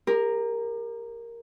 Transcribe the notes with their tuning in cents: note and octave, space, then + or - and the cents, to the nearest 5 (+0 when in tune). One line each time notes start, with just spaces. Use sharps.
G4 +35 A#4 +0